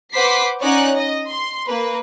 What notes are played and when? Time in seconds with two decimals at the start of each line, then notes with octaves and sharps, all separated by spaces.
0.15 B4 C5 F#5 D6 B6 C7
0.61 C#4 D#4 C#5 D5 F#5 F#6
0.97 D#5
1.28 C6
1.68 A#3 B4